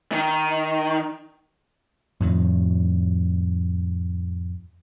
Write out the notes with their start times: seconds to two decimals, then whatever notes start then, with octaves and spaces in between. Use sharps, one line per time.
0.12 D#3
2.20 F2 A2 D#3